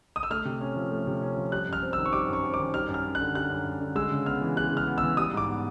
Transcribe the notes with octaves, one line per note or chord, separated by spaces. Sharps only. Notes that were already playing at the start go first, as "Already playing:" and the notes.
D#6
E6
A3 F6
C3
C#4
F3
A3
C3
C#4
F3
G3 F#6
F#2 F6
C4
D#3 E6
C#6
G3 D6
F#2 C#6
C4
D6
D#3
G3 F6
F#2
F6
F#2
D3 F#6
G3 F#6
F#2
F#2
D3
G#3 E6
C#3
B3 F6
E3
G#3 F#6
C#3
F6
B3
E6
E3
G3 D#6
G#2 D6
B3